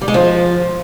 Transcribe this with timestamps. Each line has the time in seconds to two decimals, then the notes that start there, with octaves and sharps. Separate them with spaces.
0.01 G3
0.08 G#3
0.14 F3